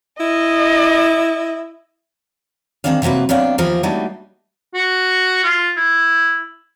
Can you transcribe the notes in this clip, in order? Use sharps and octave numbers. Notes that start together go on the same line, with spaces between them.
E4 D#5
D#3 G#3 A#3 C4 D4 F5
C3 F3 F#3 A#3 B4
C3 F#3 B3 D4 F5 G5
D#2 E3 F3 A#3 A#4
F#3 G3 A3 A#3 D4 D#4
F#4
F4
E4